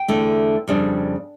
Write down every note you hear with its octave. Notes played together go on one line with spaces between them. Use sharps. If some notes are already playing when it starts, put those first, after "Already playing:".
Already playing: G5
E2 D3 A3 E4
F2 C#3 G3 D4